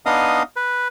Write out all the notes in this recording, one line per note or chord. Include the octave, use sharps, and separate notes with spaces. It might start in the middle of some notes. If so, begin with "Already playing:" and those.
B3 D4 D#4 D#5 F5 D#6
B4